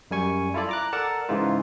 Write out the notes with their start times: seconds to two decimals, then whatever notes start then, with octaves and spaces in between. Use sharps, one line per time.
0.11 F#2 G3 G#5 C#6
0.54 E4 F4 A4 D5
0.69 A#5 D6 F#6
0.93 A4 A#4 D5 F#5 A5
1.29 G#2 C#3 E3 D#4 F4